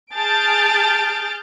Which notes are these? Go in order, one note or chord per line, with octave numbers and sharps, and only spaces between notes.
G#4 A5 F6 G6 A6 D7